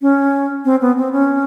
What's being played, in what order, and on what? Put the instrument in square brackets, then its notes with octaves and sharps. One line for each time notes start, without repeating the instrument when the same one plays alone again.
[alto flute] C#4
C4
B3
C4
C#4